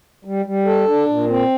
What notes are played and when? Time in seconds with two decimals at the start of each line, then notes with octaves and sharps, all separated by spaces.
0.25 G3
0.46 G3
0.66 A4
0.87 D4
1.08 A#2
1.29 C4